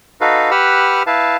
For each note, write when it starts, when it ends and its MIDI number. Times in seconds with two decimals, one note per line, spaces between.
0.21 0.51 63
0.21 0.51 66
0.21 0.51 69
0.21 0.51 71
0.21 0.51 77
0.51 1.03 67
0.51 1.03 71
0.51 1.03 78
0.51 1.03 83
0.51 1.03 88
0.51 1.03 89
1.07 1.37 64
1.07 1.37 71
1.07 1.37 77
1.07 1.37 81